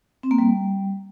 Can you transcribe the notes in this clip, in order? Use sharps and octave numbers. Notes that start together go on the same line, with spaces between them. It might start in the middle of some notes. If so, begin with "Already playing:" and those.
C4
A#3
G3